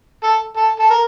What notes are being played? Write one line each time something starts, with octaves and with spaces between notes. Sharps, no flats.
A4
A4
A4
A#4